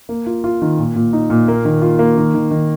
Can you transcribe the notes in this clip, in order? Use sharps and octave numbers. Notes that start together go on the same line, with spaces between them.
A#3
F4
F4
D#3
A#2
A#2
D#4
A#2
A#3
D#3
F4
A#3
D#3
D#3
D#3